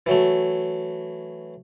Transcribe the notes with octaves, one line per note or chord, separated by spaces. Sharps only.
E3 F#3 A3